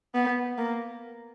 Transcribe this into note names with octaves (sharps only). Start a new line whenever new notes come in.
B3
A#3